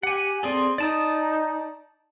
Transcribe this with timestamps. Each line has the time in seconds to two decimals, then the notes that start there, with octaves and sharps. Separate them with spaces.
0.03 G4 F#5 G#5
0.43 C4 G#4 A4 D5 C6
0.78 D#4 D5 A5 D#6